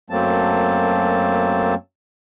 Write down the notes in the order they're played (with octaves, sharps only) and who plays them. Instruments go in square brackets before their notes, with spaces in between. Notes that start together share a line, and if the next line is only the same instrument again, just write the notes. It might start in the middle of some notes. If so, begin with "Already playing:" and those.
[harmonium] F#2 F#3 A3 A#3 C4 A5